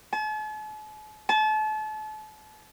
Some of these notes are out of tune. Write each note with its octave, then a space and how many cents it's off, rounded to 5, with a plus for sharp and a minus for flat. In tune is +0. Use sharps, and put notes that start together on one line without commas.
A5 -45
A5 -35